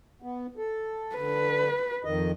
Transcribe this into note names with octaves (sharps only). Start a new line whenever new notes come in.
B3
A4
D3 B4
F2 D#3 D#5